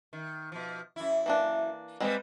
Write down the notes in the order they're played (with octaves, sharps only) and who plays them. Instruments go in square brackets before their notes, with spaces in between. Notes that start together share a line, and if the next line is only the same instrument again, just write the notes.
[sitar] D#3
B2 F3
F#2 E4
[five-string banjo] E3 A#3 D4
[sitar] G3 A#3 [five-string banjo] G#3 C4 B4